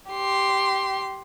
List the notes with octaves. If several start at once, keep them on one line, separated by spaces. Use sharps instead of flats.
G4 C6